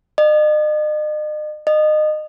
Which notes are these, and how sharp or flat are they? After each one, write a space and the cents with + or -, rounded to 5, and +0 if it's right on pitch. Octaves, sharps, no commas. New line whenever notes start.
D#5 -40
D#5 -25